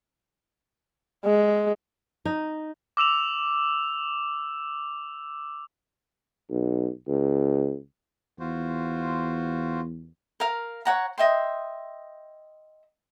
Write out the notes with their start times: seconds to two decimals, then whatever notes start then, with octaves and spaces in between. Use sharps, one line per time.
1.25 G#3
2.25 D#4
2.97 D6 E6 E7 F7
6.50 B1
7.08 C#2
8.40 E2 F4 F#4 C5
10.40 A#4 F5
10.85 C#5 F#5 A#5
11.18 D#5 E5 G5 C6